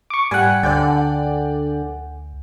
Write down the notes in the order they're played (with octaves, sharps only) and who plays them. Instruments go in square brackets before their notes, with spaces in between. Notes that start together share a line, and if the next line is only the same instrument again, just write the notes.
[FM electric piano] C#6 D6
[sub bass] G#2 [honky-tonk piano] G3 G4 [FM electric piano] F#5 G#5
[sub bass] D2 [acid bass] D3 [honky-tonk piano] D5 G5